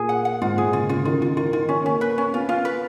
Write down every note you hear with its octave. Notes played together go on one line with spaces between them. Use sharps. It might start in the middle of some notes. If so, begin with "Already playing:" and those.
Already playing: A#2 G#4
F#5
F#5
G#2 F4
A#2 G#4
C#3 F4
C#3 F4
D#3 F4
F3 F4
D#3 F4
D#3 F4
C#4
A#3 C#4
B4
C#4
B3 F4
F4
B4